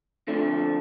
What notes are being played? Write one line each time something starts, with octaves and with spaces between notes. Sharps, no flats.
F2 D3 F3 A3 D4